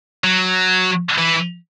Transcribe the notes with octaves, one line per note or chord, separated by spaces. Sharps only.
F#3
E3